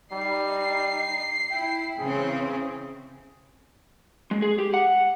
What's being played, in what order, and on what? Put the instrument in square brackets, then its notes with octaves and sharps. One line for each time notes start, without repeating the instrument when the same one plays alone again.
[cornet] G3 [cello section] D#4 [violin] C7
[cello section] E4 [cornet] G5
[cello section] C#3 E3 C4 [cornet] G#4
[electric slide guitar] G#3
G#4
G4
F#5